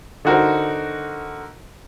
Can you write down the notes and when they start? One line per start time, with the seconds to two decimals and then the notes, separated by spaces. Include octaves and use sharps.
0.25 D3 D#4 F#4 A#4 C5